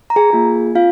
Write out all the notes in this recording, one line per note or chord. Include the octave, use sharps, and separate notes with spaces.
A#5
G#4 G#5
A#3 F4 G#4
C4 F4 F5